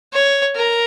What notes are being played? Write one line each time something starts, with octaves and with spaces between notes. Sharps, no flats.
C#5
A#4